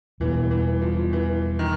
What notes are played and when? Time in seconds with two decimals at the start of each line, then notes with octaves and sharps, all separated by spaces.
0.20 E2 B2 E3 G3
0.51 E3
0.82 F3
1.13 E3
1.59 D#3